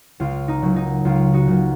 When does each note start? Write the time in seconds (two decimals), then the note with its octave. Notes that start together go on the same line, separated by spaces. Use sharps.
0.20 C#2 F4
0.48 D#4
0.62 C#3 F#3 A#3
0.76 D#4
1.05 C#2 F4
1.33 D#4 F#4
1.47 C#3 F#3 A#3